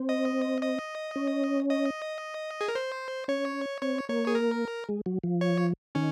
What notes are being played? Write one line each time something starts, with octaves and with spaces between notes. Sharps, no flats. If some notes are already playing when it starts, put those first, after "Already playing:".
Already playing: C4
D#5
D#5
C#4
D#5
G#4
A#4
C5
C#4 C#5
C4 C#5
A#3 C#5
G#4
A#4
G#3
F#3
F3
C#5
D#3 C#4